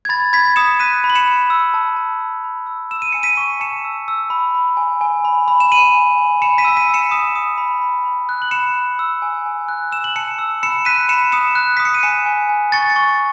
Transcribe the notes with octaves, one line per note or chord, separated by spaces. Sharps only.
G#6
B5 A6
B5 G#6 B6
D#6 C#7 E7
F#6 B6 D#7
B5
F#7
C#7 E7
B5
E6
A5
A5
E6
B5
E6
E6 E7
D#7
G#5 C#7
B6 D#7
C#6
A5 C#7 E7
E6
E6
B5
B5
G#5
G#5
B5
B5
E7
B5 D#7 F#7
G#5
G#5
B5 C#7 E7
B6 D#7
E6
B6 D#7
E6
C#7 E7
D#6 C#7 E7
D#6
B5
B5
B5
F#6
F#7
B5 C#7 E7
B5
E6
G#5
G#5
F#6
E6 E7
F#7
A5 C#7 E7
E6
B5 C#7 E7
F#6 B6 D#7
B5 C#7 E7
D#6 C#7 E7
F#6
D#6 B6
C#7
D#7
G#5 C#7 E7
G#5
G#5
C#6 A6 C#7
A6 C#7
C#6
A6